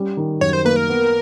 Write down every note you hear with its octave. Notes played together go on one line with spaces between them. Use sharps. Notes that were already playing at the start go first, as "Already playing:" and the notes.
Already playing: G3 C#4
D#3
F#2 C#5
C5
A#3 B4
A#4
B3